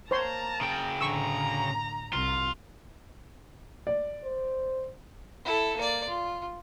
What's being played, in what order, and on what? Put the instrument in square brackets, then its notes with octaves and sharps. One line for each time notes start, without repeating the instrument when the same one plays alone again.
[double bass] A#3 [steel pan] C5 C#5 C6 [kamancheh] A5 A#5
[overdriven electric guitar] C#3 G5
[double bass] A2 D3 [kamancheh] A#5 [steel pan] C#6 E6
[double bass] C2 [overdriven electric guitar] F4
[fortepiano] D5
[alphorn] C5
[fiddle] E4 A4
A#3 D5
F4